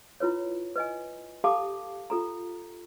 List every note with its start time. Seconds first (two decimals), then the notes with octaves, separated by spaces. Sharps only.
0.20 E4 F4 B4 C#5
0.76 B4 D#5 G#5
1.44 G4 A4 F5 A5 B5 D6
2.10 F4 A4 A#5